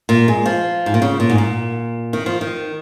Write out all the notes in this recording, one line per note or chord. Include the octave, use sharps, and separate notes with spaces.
A#2
G#3
F3
G#2
A#2
C#3
A#2
G#2
A#2
D#3
F3
D#3